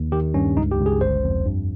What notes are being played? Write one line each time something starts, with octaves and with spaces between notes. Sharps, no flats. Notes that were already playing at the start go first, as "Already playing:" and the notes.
Already playing: D#2
D#3 G4
G2 C#4
C#2 D#4
G4
C#2
G#4
G1 C5
F2
G2